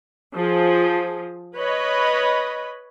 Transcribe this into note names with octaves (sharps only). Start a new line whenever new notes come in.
F3 G#4
B4 C#5 D#5 B5